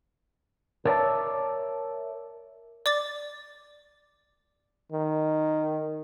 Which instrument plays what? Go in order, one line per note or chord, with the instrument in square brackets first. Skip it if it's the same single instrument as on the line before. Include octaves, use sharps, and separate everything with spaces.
[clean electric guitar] A#4 C#5 D5 E5 A5
[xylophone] D5 D6 A6
[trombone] D#3